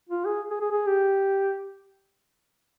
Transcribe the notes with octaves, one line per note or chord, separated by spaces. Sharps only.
F4
G#4
G#4
G#4
G#4
G4